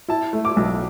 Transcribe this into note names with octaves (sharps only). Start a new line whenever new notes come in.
E4 A5
A3
D6
B1